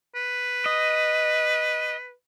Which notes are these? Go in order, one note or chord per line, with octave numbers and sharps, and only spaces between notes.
B4
D#5